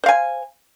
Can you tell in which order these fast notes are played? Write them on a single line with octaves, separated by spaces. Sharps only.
C5 F5 G#5